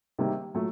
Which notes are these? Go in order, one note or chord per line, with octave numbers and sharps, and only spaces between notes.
C3 D#3 G3 A#3
A#2 F#3 A3